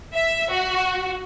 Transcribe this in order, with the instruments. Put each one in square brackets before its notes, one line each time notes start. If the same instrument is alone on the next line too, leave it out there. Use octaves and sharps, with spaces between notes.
[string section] E5
F#4